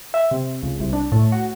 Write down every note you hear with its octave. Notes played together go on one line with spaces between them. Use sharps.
E5
C3
C#2
C2
D4
A2
F#4